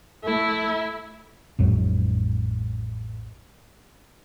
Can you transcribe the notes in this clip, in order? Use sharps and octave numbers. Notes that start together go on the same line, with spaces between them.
A3 E4
A1 F2 G#2 F#3